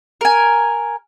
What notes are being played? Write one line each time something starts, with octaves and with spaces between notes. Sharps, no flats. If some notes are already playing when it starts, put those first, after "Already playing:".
A#4 G#5